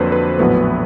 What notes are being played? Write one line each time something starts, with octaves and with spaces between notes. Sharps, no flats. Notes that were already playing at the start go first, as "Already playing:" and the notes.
Already playing: F2 D3 F#3 A#3 B4 C5
B4
A#1 A2 F#3 B3